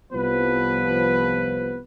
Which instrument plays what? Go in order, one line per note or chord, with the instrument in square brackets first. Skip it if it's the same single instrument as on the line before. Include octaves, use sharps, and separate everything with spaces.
[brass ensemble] C2 F3 B3 B4